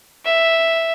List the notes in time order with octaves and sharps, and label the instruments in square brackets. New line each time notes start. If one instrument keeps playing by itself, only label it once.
[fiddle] E5